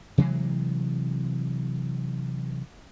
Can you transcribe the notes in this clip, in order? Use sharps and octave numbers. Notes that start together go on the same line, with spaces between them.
C3 E3 F#3 G#3